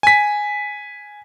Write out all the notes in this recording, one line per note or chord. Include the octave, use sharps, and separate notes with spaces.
G#5 B6